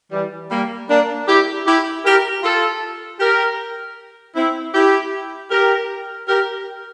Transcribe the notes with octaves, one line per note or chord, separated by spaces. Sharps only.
E3 G3
G3 A#3
A#3 D4
E4 G4
E4 G4
G4 A#4
F4 A4
G4 A#4
C4 E4
E4 G4
G4 A#4
G4 A#4